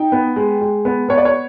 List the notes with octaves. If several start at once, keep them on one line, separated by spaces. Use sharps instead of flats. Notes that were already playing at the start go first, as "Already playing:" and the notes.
Already playing: D#4 G5
B3
G#3
G#3
B3
B3 C#5
D5
C#5